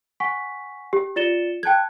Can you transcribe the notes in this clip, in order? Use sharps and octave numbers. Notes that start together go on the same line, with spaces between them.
F#5 G#5 C#6 B6
G4
F4 D5 A6 C#7 E7 G7
G5 A5 F#6 G#6